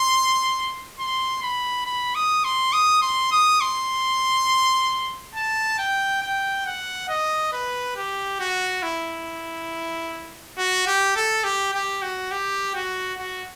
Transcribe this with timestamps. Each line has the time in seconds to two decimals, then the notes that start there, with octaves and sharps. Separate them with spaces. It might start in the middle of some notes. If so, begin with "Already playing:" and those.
Already playing: C6
0.99 C6
1.42 B5
1.86 B5
2.15 D#6
2.44 C6
2.73 D#6
3.02 C6
3.32 D#6
3.61 C6
5.35 A5
5.78 G5
6.22 G5
6.66 F#5
7.09 D#5
7.52 B4
7.96 G4
8.40 F#4
8.83 E4
10.57 F#4
10.87 G4
11.16 A4
11.44 G4
11.73 G4
12.02 F#4
12.31 G4
12.75 F#4
13.19 F#4